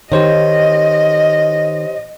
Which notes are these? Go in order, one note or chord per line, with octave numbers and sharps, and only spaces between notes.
D#3 G4 C5 C#5 D#5